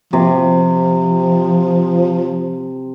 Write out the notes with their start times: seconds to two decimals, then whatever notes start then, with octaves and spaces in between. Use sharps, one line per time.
0.13 C3 F3